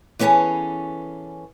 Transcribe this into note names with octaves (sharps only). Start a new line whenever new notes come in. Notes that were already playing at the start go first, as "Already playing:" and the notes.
E3 B3 C#4 G#4 A4 C#5